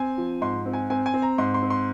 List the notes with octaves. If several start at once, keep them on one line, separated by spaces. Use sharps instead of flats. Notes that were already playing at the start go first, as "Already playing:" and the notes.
Already playing: C4 G#5
F3
G#2 C6
C4
G#5
C4 G#5
G#5
C4
A#5
G#2 C6
C6
C4
C6